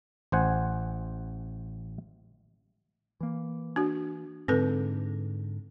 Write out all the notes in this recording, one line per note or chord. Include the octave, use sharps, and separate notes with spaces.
A1 C5 F#5 G#5
E3 A#3
D4 F#4
G#2 D3 C4 A4 B4